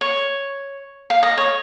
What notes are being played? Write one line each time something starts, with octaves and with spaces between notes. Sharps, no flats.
C#5
F5
D#5
C#5